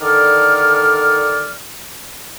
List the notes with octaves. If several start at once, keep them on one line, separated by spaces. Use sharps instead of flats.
D3 D#3 A4 D5 F6